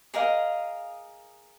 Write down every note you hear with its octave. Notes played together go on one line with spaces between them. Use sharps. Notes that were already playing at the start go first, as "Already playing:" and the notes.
G#4 A#4 D#5 F5